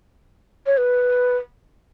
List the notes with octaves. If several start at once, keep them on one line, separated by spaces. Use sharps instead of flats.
C#5
B4